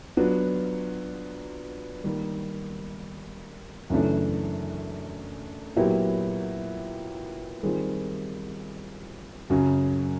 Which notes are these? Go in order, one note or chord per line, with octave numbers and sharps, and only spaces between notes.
F#3 B3 D4 F4
D#3 G3 A#3
F#2 C#3 E3 A3 D4
A#2 F#3 B3 E4 G4
D#3 G3 C4 F4 G#4
F#2 C#3 F#3